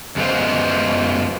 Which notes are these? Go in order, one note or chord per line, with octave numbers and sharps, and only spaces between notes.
F#2 G#3 B3 F4 C5